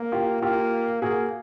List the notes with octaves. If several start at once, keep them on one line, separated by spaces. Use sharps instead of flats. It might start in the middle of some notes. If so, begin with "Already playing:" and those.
Already playing: A#3
F4 G4
A#3 F4 G4
A#3 F#4 G#4